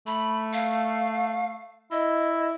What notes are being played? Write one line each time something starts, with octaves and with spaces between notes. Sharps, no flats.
A3 B5
F5
E4 D#5